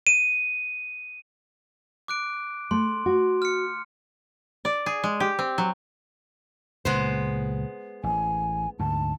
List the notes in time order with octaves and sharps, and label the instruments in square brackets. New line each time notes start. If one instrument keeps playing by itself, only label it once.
[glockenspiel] D#7
D6 F#6 D7
[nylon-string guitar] A3 [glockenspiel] C6
[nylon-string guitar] F#4
[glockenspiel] F6 C#7
[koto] D5
G#4
G#3
G4
C4
F#3
[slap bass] C#2 A#2 C#3 [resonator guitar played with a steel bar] G#3 B3 C5
[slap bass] A1 [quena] G#5
[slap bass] D2 G#2 [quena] A5